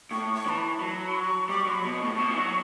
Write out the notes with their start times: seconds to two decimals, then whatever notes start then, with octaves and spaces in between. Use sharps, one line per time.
0.11 A2 C#6
0.34 C#6
0.46 E3 A5
0.58 B5
0.81 F#3 A5
1.05 B5
1.15 C#6
1.49 G3 D6
1.61 C#6
1.67 F#3 B5
1.82 B2 C#6
2.02 A2
2.12 A2
2.19 B2
2.31 E3
2.37 F#3